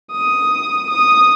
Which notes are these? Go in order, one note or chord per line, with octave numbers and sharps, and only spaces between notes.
D#6
D#6